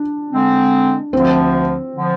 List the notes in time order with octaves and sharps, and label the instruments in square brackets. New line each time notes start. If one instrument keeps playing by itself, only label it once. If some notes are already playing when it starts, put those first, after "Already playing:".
Already playing: [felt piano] D4
[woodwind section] D3 G#3 C4
[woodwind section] D2 D3 F3 [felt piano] C4
[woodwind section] D3 F3